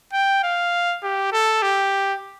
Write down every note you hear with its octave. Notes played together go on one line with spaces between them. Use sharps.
G5
F5
G4
A4
G4